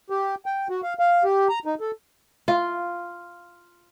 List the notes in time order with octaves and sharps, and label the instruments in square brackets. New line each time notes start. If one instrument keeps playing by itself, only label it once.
[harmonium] G4
G5
F#4
F5
F5
G4
A#5
D#4
A4
[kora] F4